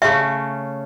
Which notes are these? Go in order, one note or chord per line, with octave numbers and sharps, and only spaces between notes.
C#3 A3 C#4 E5